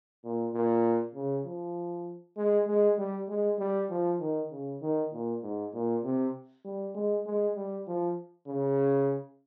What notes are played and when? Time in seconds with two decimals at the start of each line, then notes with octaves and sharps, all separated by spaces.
0.24 A#2
0.54 A#2
1.15 C#3
1.45 F3
2.37 G#3
2.67 G#3
2.98 G3
3.29 G#3
3.59 G3
3.90 F3
4.20 D#3
4.52 C#3
4.82 D#3
5.13 A#2
5.43 G#2
5.74 A#2
6.04 C3
6.65 G3
6.95 G#3
7.26 G#3
7.56 G3
7.87 F3
8.47 C#3